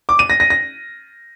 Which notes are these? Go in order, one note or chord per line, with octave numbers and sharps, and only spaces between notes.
D6
D#7
A#6
A#6
A#6